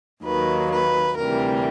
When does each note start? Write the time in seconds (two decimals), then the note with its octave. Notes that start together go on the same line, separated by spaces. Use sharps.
0.23 D#2 D#3 F#3 A#3 B4
0.70 B4
1.17 D2 C3 E3 G3 A#4